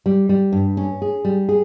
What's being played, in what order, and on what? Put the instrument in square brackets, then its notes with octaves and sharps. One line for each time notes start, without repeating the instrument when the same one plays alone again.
[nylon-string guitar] G3
G3
G2
C#4
G#4
G3
G#4